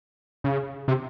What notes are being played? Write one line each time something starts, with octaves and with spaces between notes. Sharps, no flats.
C#3
C3